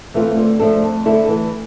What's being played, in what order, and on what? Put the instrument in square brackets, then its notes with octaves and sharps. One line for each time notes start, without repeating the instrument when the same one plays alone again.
[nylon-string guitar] E3 A3 C4 F4
D3
F3 A3 D4 A4
F2
D3 A3 E4 A4
E3